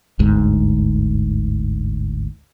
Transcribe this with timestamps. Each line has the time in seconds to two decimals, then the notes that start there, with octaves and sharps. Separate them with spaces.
0.19 G1 D2 G#2